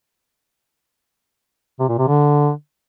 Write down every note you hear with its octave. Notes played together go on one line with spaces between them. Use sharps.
C3
A#2
C3
D3